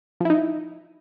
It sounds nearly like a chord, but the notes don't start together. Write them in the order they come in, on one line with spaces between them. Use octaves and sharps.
F3 E4 D#4